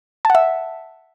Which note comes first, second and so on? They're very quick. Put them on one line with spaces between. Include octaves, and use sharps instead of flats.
A5 F#5 E5